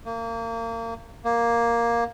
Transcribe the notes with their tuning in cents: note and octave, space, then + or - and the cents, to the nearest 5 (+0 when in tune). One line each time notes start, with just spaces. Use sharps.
A#3 -30
A#3 +5